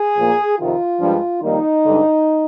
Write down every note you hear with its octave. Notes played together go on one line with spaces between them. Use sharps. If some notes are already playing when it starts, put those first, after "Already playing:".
Already playing: G#4
A#2 F3 A#3
F2 C3 D#3 F4
G2 F3 G#3 D4
F2 D#3 G3 A#3 D#4
G2 D3 G#3 D4